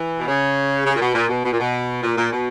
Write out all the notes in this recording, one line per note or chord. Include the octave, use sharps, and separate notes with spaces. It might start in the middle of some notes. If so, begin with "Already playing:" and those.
Already playing: E3
B2
C#3
C#3
A#2
B2
A#2
B2
B2
A#2
B2
A#2
A#2
B2